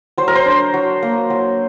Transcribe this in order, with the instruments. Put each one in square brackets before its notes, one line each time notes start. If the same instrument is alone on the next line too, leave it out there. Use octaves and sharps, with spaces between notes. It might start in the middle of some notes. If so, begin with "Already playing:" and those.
[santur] F#3 C5
A#4
C5
D4
F#3
A#3
F#3